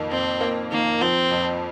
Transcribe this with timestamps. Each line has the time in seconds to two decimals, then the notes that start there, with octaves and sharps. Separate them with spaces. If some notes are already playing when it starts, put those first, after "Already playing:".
Already playing: F2 D#3 A#3
0.11 F2 C4
0.41 A#3
0.71 D#3 A#3
1.01 F3 C4
1.31 F2